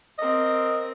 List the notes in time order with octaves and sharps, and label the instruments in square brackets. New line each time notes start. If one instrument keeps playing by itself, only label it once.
[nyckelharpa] C4 A#4 [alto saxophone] D#5